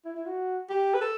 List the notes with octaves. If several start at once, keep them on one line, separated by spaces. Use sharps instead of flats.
E4
E4
F#4
G4
B4
A4